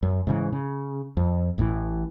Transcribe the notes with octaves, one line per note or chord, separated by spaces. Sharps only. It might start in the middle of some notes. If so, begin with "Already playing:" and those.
F#2
G#2 C#3 E3
C#3
F2
A1 A2 C3 E3